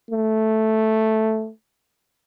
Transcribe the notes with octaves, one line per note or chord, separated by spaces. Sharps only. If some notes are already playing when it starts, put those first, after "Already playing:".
A3